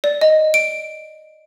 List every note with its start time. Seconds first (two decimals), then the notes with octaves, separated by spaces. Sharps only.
0.04 D5
0.21 D#5
0.54 D7